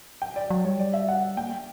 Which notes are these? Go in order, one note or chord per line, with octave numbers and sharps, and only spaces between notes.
G5
D5
F#3
G3 C#5
D5
E5
F#5
A#3 G5